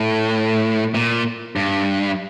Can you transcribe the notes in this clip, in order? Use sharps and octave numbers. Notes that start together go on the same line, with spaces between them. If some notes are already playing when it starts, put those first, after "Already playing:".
Already playing: A2
A#2
G2